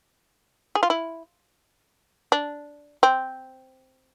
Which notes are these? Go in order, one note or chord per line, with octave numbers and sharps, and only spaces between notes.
G#4
F4
E4
D4
C4